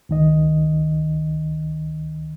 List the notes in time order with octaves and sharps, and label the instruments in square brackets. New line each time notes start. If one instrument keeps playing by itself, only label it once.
[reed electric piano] C#2 D#3 D#5